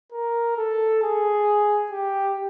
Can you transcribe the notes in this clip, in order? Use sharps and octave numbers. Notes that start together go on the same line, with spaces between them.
A#4
A4
G#4
G4